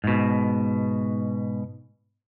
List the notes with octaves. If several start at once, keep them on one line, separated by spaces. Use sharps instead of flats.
G#2 B2